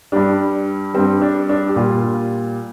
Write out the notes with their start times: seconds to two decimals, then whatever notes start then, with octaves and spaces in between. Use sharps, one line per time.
0.12 G2 G3 D4
0.94 G3 C4
0.98 G2
1.22 D4
1.49 D4
1.69 G4
1.76 A#2 G3 F4